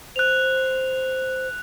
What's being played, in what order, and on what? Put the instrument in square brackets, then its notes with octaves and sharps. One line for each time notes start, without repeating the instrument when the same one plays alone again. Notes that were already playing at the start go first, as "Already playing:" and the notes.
[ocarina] C5 [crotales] F#6 F7